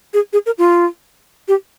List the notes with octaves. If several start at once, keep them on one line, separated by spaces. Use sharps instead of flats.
G#4
G#4
A#4
F4
G4